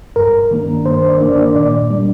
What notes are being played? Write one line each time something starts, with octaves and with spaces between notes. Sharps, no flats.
G2 A#4
D#3 A#3 D4
G2 C5
D5
D#3 A#3 D4
D5
A#2 D5
G3 D4